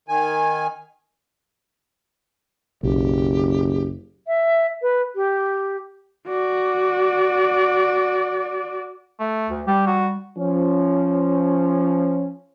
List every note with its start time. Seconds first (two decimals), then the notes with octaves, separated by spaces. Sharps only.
0.08 D#3 G#5
2.83 F#1 B1 G4
4.27 E5
4.82 B4
5.15 G4
6.28 F#4 D5
9.20 A3
9.49 D2
9.67 G3 G4
9.87 F#4
10.37 F3 C#4